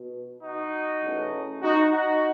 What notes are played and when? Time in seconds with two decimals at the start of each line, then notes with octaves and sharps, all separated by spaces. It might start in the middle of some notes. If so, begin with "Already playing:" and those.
Already playing: B2
0.43 D#4 F#4
1.03 E2 B2 A3 C#4
1.63 D#4 F#4
1.93 D#4 F#4